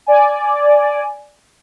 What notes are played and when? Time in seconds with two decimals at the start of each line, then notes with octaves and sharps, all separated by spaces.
0.06 D5 G#5